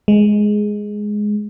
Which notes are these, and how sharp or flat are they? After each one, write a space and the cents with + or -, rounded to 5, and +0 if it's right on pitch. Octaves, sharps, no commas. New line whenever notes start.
G#3 +5